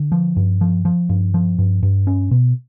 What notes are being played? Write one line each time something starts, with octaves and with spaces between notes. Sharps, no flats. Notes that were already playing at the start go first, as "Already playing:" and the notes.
Already playing: D3
F3
G2
F3
F3
G2
F3
G2
G2
C#4
B2